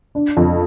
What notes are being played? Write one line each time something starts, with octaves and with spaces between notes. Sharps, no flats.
D4
F2